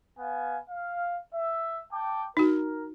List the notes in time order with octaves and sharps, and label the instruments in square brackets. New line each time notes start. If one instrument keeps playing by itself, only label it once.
[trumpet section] B3 F5 G#5
F5
E5
G5 A5 D6
[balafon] D#4 F#4 [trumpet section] A#4